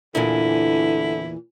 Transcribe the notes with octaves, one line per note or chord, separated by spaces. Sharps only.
E2 A#2 D3 E3 E4